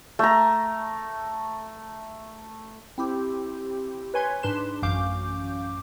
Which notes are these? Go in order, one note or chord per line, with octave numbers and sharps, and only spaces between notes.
A3 A#5
C4 E4 G4
B4 C#5 G#5 C6 G#6
G#2 D4 B4 C6 E7
A1 F#2 C#4 F5 D6 G6